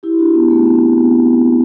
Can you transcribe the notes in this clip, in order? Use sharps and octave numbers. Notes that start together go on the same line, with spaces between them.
E4 G4
D4 F#4
B3
A3
C4
B3